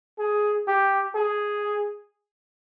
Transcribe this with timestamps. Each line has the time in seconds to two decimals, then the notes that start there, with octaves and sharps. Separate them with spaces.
0.19 G#4
0.68 G4
1.16 G#4